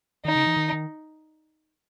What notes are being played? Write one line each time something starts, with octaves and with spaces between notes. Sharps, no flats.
D#3 D#4
C#3
E3
D#3
D#3